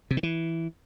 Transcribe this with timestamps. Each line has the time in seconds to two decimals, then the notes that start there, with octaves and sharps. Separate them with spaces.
0.11 C3
0.17 D#3
0.23 E3